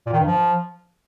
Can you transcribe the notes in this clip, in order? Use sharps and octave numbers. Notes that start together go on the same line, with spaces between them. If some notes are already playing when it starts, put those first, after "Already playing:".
A#2
D#3
G2
F3